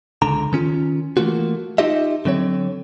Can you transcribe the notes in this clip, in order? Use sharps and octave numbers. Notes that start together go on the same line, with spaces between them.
C#2 D3 A#5
D#3 C#4 F4
E3 A3 A#3 F4 F#4
D#4 F4 G4 D#5 E5
D3 F#3 C4 C#5